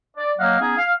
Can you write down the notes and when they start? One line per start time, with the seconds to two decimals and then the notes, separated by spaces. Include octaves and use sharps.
0.17 D5
0.38 F#3 A#3 D#5 F5 F#5
0.60 B3 C#4 D#4 G#4
0.78 F5